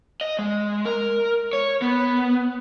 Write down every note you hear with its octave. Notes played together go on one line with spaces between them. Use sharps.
D#5
G#3
A#4
C#5
B3